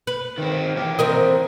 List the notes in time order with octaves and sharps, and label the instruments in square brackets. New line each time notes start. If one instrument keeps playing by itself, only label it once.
[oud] B4
[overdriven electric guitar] D#3 C4
E3 G4
[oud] C4 A#4 D#5